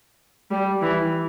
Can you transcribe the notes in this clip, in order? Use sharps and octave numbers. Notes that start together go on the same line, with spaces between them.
G3
E3